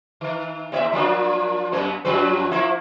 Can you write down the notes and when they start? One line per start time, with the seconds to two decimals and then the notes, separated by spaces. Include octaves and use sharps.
0.21 D#3
0.72 D#2 C#5 E5
0.93 F3 A#3 D4
1.72 F#2 A#3 B3
2.05 F#2 F3 B4
2.51 F3 A#3 E4